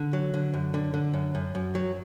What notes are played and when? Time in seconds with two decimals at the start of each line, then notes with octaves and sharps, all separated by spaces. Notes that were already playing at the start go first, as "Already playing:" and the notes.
Already playing: D3
0.13 F#3
0.34 D3
0.53 F#2
0.74 D3
0.94 D3
1.14 F#2
1.35 F#2
1.55 F#2
1.75 F#3